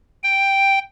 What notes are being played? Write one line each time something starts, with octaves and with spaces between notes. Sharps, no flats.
G5